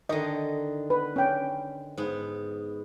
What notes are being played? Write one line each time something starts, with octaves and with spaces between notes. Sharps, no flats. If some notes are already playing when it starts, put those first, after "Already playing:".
D3 D#3 D#5
B4
C#4 G5
G#2 B3